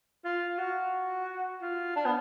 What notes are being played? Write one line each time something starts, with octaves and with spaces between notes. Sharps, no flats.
F4
F#4
F4
D4
B3